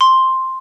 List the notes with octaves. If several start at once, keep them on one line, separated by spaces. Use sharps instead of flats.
C6